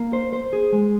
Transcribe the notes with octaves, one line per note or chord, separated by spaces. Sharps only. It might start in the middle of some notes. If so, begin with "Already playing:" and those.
Already playing: A#3
C5
C5
G#4
G#3